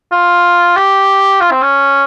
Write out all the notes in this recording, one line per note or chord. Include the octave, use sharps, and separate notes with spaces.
F4
G4
F4
C4
C#4